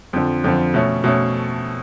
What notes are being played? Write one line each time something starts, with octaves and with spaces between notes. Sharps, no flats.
F2 D3 F3
F2 D3 F3
B2 A3 C#4
B2 A3 C#4